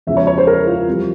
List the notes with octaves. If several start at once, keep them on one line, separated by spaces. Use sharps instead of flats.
E2 C#3 F3 G#3 E5
C#5
C#5
C5
A#4
F4
F2 E3 G3